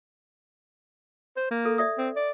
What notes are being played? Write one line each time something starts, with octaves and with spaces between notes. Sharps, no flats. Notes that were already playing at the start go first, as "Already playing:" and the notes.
C5
A#3
A4
D5 E5 D#6
C4
D5